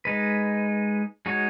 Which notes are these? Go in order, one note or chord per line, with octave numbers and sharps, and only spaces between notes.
G#3 D#4 B4
G#3 D#4 F#4 C#5